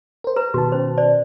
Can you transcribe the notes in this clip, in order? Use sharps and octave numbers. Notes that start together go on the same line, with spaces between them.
A#4 C5
B4 A#5
B2 D#3 F#4 A5
C#4 C5
C5 D5